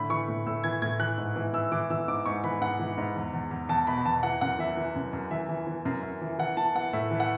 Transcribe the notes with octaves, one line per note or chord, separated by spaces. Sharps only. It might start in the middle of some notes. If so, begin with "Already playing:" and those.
Already playing: A2 D3 B5
E3 C#6
A2
A2 E6
E3 G#6
A2 G#6
E3 F#6
G#2
E3
E3 E6
E3 D6
E3 E6
G#2 D6
G#2 C#6
E3 B5
G#2 F#5
E3
G#2
E2
E2
E2
E2 A5
B2 B5
E2 A5
E3 F#5
F#2 F#5
E3 E5
E3
F#2
F#2
E3 E5
E3
E3
F#2
F#2
E3
E3 F#5
E3 A5
E3 F#5
A2 E5
E3
F#5